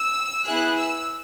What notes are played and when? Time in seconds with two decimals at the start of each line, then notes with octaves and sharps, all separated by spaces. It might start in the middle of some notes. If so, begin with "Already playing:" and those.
Already playing: E6
0.46 B3 E4 G#4 F#6
0.77 E6